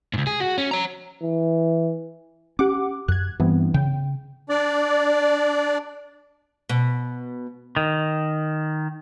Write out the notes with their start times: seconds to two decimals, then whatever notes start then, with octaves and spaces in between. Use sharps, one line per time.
0.13 C#2 G#2
0.27 G#4
0.40 F#4
0.58 C#4
0.71 C#5 A#5
1.22 E3
2.59 C#4 G4 F#5 D6
3.08 F#2 F#6 G#6
3.40 G2 E3 B3 C4
3.74 C#3 G5
4.49 D4 D5
6.69 B2
7.76 D#3